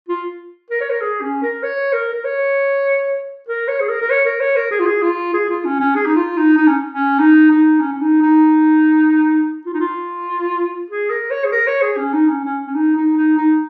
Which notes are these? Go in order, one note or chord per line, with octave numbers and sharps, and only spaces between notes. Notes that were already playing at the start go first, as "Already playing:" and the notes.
F4
A#4
C#5
A#4
G#4
C#4
A#4
C#5
A#4
A#4
C#5
A#4
C#5
G#4
A#4
A#4
C#5
A#4
C#5
A#4
G#4
F4
G#4
F4
G#4
F4
C#4
C#4
G#4
D#4
F4
D#4
D#4
C#4
C#4
D#4
D#4
C#4
C#4
D#4
D#4
F4
D#4
F4
G#4
A#4
C#5
G#4
A#4
C#5
G#4
C#4
D#4
C#4
C#4
C#4
D#4
D#4
D#4
D#4